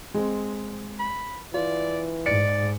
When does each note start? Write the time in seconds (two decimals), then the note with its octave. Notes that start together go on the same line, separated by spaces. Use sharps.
0.14 G#3 C4
0.99 B5
1.54 E3 F4 D5
2.26 G#2 D5 C#7